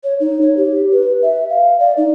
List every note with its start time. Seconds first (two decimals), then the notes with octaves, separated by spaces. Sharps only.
0.04 C#5
0.20 D#4
0.41 C#5
0.57 G4
0.92 B4
1.22 E5
1.50 F5
1.80 D5
1.97 D#4